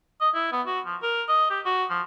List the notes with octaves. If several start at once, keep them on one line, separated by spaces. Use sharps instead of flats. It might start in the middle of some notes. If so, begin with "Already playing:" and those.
D#5
E4
B3
F#4
F3
A#4
D#5
G4
F#4
F3